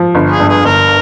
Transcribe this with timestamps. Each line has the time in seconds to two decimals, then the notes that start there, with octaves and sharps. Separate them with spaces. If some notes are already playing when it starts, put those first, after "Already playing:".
Already playing: F3
0.15 G1
0.32 G#4
0.40 G2
0.49 G#4
0.65 G1 A#4